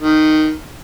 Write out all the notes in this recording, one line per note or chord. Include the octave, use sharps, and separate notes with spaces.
D#3